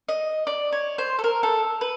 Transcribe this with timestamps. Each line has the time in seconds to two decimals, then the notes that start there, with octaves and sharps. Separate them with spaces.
0.09 D#5
0.47 D5
0.72 C#5
0.98 C5
1.19 A4
1.24 A#4
1.43 A4
1.81 B4